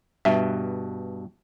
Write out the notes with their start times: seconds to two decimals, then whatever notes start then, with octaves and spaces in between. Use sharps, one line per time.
0.25 G2 B2 E5